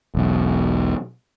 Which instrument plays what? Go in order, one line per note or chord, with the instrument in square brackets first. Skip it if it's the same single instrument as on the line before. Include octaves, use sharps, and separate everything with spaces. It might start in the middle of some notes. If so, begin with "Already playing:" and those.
[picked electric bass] E1 B1